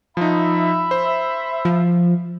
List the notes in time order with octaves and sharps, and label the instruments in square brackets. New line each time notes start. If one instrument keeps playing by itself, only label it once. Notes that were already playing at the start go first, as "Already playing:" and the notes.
[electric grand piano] F3 D#4 [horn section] E5 B5
[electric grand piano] C5
[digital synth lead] F3